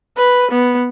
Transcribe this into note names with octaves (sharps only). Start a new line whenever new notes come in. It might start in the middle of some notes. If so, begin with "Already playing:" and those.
B4
B3